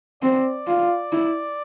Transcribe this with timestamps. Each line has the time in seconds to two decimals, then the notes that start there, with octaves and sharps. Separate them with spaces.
0.23 C4 D5
0.67 F4
1.12 E4